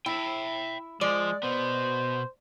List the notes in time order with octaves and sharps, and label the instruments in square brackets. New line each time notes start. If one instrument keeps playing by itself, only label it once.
[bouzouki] E4 [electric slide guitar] E5 G5
[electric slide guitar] F3 [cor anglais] G#3 [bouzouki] D5
[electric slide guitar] B2 B3 [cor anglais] C5